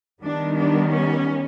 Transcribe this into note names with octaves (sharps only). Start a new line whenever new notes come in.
D#3 G3 B3 D4
D4
C#4